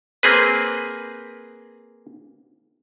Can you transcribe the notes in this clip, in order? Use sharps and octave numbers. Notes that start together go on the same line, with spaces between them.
A#3 C4 G#4 B4